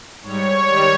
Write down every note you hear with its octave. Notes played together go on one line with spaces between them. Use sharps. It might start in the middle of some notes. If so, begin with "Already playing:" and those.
G#2 G3 C#5
D#3 G3